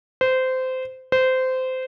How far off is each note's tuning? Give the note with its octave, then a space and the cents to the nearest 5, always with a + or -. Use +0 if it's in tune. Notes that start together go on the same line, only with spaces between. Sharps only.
C5 -20
C5 -20